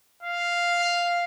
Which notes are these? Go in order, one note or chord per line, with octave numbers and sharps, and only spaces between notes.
F5